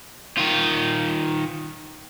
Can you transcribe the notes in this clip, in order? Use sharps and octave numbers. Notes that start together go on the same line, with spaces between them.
D#3 F4